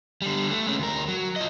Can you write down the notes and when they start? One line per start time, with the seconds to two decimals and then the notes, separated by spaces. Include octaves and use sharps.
0.22 D3 G3
0.50 A3
0.67 G#3 C#4
0.79 D2 A#4
1.08 F#3
1.36 F4 D#5